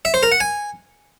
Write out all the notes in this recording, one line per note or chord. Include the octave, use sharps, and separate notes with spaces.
E5
C5
A#4
F#5
G#5